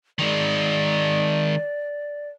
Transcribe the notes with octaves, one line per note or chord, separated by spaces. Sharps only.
D#3 G#3 D5